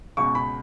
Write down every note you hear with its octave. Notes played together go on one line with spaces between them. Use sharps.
C#2 B2 C#6
B5